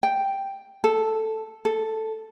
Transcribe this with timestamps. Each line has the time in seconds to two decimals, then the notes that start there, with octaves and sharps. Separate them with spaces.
0.03 G5
0.84 A4
1.65 A4